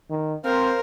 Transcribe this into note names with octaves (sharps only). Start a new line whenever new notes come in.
D#3
C4 A#4 C5 F5